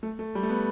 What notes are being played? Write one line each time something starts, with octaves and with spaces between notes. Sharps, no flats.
A3
A3
G3
A3
B3